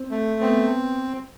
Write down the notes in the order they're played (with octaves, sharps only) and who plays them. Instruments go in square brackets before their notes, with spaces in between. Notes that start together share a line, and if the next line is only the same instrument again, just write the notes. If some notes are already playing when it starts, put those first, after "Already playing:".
Already playing: [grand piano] C4
[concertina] A3
[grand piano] B3 [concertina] C4